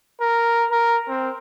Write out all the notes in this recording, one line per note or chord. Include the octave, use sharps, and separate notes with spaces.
A#4
A#4
C4